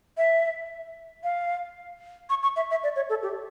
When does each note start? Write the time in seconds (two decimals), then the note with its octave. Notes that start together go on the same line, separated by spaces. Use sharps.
0.17 E5
1.24 F5
2.30 C#6
2.43 C#6
2.56 E5
2.70 E5
2.83 D5
2.96 C#5
3.09 A4
3.23 G4